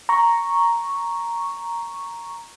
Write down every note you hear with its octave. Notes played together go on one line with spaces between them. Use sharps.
A#5 C#6